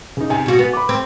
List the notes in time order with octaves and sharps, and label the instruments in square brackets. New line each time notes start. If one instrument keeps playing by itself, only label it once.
[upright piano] C#3 D#4
[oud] C3 [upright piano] G#5
[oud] B2 F#4
B3
[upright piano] B5 D6
[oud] C4